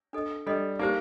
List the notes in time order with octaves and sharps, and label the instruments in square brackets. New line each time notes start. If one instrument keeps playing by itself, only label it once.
[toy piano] D4 A4 D#5
[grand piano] G3 [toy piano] D4 A4 D#5
[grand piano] A#3 [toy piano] D#4 G4 C5